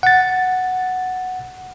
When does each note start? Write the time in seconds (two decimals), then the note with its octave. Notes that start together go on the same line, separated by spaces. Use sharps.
0.03 F#5 A6